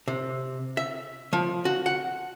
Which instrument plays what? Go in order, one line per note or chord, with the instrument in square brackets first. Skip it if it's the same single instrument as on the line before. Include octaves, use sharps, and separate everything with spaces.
[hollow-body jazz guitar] C3
E5
F3
F#4
F#5